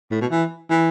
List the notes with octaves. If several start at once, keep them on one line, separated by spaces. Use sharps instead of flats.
A2
B2
E3
E3